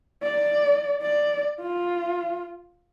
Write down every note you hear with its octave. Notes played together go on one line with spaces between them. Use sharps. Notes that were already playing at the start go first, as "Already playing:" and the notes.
D5
D5
F4